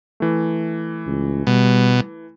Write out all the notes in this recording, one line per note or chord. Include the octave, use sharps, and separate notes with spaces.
E3 A3
C#2
B2 G3